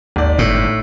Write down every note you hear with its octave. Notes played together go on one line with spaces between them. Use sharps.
G#1 D#2 D5
G1 A2